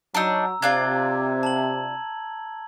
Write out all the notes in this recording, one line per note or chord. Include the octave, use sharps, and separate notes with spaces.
F#3 D4 D#4 A#5 E6
C3 D4 F4 D5 G#6
A5 F#7